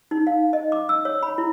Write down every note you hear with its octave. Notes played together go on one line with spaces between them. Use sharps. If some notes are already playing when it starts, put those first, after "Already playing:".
D#4
F5
D#5
D6
E6
C#5
B5
E4